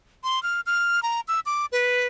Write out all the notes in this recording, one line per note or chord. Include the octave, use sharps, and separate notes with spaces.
C6
F6
F6
A#5
E6
D6
B4